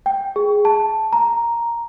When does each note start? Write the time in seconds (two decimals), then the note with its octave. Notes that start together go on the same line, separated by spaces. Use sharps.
0.06 G5
0.36 G#4
0.65 A5
1.13 A#5